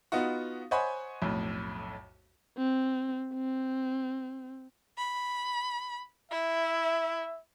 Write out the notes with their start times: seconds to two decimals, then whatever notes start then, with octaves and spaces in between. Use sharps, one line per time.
0.12 B3 D#4 F4 F#4
0.71 C5 C#5 D#5 F#5 G#5 B5
1.22 B1 F2 A2
2.58 C4
3.34 C4
4.98 B5
6.31 E4 E5